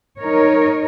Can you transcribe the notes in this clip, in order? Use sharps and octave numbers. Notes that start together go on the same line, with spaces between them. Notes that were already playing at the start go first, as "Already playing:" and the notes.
D#4 A#4 C#5